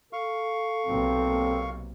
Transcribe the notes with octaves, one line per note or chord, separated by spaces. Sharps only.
A4 F5 C#6
B1 C3 A#3 C4